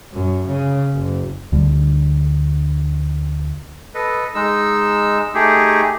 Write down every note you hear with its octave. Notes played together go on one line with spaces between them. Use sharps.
F#2
C#3
F#1
D2 D3 G3
A4 B4 D#5
G#3 D#4 E6
A3 D#4 G4 G#4